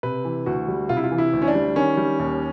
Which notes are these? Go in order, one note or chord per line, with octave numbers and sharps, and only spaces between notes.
C3 B4
E3
D2 F#4
G3
C3 F4
E4
F4
E3
E4
D2
C#4
D4
G3
D#3 C#4
G3
D#2